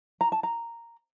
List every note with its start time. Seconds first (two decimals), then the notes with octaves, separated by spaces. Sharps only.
0.21 A#5
0.32 A5
0.43 A#5